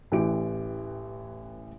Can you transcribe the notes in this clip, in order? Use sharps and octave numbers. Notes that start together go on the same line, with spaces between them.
A1 E3 G4 D7